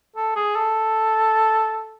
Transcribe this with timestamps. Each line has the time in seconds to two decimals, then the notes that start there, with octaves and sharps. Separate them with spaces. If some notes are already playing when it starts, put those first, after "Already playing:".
0.16 A4
0.36 G#4
0.55 A4